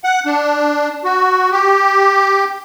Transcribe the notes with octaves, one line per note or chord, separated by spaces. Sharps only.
F#5
D4
F#4
G4